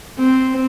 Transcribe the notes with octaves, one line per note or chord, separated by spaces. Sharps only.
C4